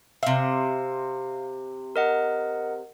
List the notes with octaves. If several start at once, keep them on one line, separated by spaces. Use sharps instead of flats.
C3 E5 F5
A#4 D#5 F#5